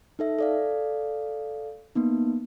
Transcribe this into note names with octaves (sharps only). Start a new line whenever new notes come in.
D#4 A4 E5
A4 D5 F5
A#3 B3 D#4